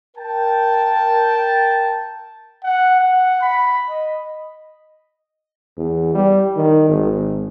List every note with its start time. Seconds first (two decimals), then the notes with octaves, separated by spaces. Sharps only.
0.16 A#4 G5 A5
2.64 F#5
3.00 F#5
3.42 B5
3.89 D#5
5.77 E2
6.14 G3
6.56 D#3
6.89 G#1